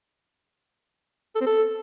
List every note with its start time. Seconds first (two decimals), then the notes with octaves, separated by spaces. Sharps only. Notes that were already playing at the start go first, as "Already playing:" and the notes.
1.36 A4
1.41 C4
1.46 A4